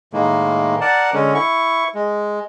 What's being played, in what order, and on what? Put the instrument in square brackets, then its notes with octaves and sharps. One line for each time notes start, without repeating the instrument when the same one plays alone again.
[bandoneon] A2 D#3 G#3 A#3
A#4 D5 F#5 A5
D3 G#3 C#4
E4 C#6
G#3